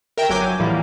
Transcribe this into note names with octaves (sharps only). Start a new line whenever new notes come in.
A#4 E5 G5 G6
G1 F#3 G#5 D6 G6
F#3
A2 E3 F3 G3 A#3